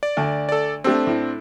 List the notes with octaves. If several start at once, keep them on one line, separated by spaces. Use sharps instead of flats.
D5
D2
A4 D5
A3 C4 D4 G4 A4
A2